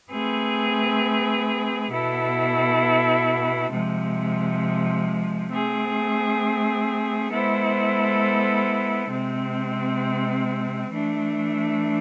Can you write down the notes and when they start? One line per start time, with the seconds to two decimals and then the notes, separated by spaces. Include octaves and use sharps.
0.10 A3 C4 G#4 B4
1.90 B2 B3 E4 A4
3.70 C3 F3 G#3
5.50 A3 C4 G#4
7.30 G#3 B3 E4 A4 C5
9.10 C3 G#3 C4
10.91 E3 A3 D4